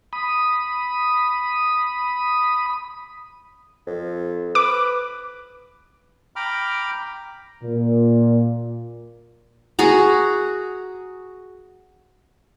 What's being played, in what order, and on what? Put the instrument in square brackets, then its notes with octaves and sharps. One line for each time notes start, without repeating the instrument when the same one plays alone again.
[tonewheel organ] B5 D#6
[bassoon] F2
[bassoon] B4 [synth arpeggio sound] D6
[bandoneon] G5 A#5 B5 D6 F6
[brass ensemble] A#2
[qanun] F#4 G#4 A#5